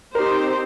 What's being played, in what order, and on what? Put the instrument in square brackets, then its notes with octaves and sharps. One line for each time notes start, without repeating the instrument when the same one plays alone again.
[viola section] C4 D#4 G4 C5 [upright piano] A#4